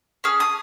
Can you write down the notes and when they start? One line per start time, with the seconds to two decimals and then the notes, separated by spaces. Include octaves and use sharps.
0.24 C#4 G#4 F6
0.40 D#6